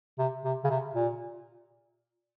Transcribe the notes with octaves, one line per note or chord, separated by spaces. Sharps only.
C3
C3
C#3
C3
A#2